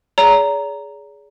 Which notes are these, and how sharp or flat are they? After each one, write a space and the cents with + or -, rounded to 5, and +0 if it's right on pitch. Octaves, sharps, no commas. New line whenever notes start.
G#4 +5 D5 -45 A#5 +0